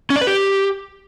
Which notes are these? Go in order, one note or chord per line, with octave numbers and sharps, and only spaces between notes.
C#4
D5
B4
G4